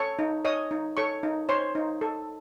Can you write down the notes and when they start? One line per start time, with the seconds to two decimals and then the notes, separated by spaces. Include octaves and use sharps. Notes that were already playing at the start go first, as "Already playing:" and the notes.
Already playing: A4 C#5 C#6
0.19 D#4
0.45 C#5 D#5 D#6
0.71 D#4
0.97 A4 C#5 C#6
1.23 D#4
1.49 C5 C#5 C6
1.75 D#4
2.01 A4